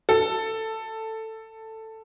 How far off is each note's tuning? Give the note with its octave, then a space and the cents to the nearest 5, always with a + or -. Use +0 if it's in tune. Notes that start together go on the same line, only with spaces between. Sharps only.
A4 +10